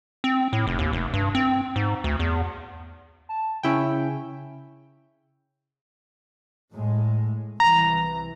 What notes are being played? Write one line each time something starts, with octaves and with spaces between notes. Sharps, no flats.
C4
A2
F1
D#2
F1
G2
C4
G#2
D2
E2
A5
C#3 C#4 E4 G5
A2 G#3
C2 E3 A#5